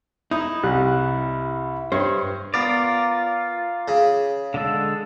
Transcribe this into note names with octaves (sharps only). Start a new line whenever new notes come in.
D#4 E4 D#6
C2 G3 F#6
G2 C5 C#5
B3 F4 A#4 D5
C#3
D3 G#3 A4